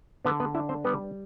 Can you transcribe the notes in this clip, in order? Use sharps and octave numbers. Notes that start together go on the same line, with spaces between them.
D3 B3 B4
B3 B4
D4 E4 E5
C4 C5
G3 B3 B4